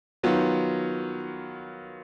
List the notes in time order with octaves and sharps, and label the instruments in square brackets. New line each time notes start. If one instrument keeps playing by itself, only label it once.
[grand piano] D#3 F#3 B3 F4